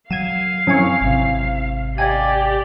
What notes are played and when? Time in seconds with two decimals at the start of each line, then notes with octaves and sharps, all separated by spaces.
0.10 F#3 F5 G#6 D#7 E7
0.67 F#2 C4 E4 G#5 C#6
1.01 G#1 C3
1.98 G4 D5 D#5 F5 G5 G#5